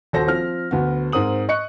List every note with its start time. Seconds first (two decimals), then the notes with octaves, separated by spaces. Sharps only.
0.13 D#1 F#4 A4 C5 A#6
0.27 F3 C4 F6
0.71 D2 B3 F#4
1.12 G#2 C4 A#4 D#6 F#7
1.49 D#5 C#6 F#6 C#7